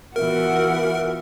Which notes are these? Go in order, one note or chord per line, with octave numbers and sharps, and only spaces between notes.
E3 B3 F4 F#4 A#4 E5 F#5